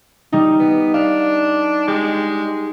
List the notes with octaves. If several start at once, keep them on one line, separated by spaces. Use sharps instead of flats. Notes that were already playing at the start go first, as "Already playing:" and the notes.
G3 D#4
B3
D4 F5
G#3 G4